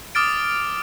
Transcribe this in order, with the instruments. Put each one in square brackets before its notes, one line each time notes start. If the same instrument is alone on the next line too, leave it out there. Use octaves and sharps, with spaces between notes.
[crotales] D6 D#6 F6 A6 D7